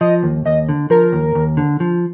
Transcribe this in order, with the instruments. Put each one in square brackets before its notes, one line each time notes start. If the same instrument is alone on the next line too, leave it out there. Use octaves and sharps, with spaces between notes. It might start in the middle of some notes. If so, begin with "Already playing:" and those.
[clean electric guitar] F3 [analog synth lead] D#5
[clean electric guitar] D#2
[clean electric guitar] D#2 [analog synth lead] D#5
[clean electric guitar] D3
[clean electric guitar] F3 [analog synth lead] A#4
[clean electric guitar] D#2
D#2
D3
F3